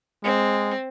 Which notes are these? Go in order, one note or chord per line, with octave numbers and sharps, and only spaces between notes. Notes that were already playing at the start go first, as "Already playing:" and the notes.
G#3 C4